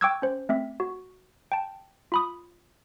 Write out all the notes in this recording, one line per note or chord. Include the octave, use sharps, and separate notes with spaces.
G5 C#6 D6 E6 F#6 G#6
C#4 C5
A3 C4 E5
F#4
G5 A5
F4 B5 D#6